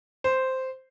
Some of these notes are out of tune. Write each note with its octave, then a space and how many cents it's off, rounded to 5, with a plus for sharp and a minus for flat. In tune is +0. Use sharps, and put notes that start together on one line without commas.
C5 -5